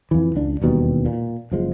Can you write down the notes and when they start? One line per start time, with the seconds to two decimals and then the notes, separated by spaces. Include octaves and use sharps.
0.11 F2 E3
0.35 C#2 D4
0.61 E1 D#2 B2 G3
1.06 A#2
1.51 F#1 F3 G#3